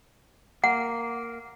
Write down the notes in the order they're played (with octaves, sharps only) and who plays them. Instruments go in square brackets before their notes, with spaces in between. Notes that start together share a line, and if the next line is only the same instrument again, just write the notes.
[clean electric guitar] A#3 [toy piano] F#5